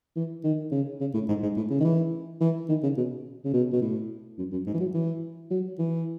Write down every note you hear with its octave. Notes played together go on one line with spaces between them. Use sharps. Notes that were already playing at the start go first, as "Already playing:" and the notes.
E3
D#3
C#3
C#3
A2
G#2
G#2
A2
C#3
D#3
E3
E3
D#3
C#3
B2
C#3
B2
B2
A2
F#2
F#2
G#2
E3
F#3
E3
F#3
E3